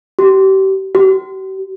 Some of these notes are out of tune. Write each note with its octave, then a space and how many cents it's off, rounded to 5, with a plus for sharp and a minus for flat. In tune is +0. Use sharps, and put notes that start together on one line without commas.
G4 -35
G4 -45